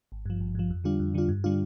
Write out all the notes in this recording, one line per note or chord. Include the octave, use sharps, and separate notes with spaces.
G#1
G2 F3
G#1
G2 F3
F2
D3 G3 D4 F4
F2
D3 G3 D4 F4
G2
D3 G3 D4 F4